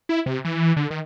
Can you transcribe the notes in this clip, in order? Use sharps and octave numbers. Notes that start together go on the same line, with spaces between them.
E4
C3
E3
D3
D#3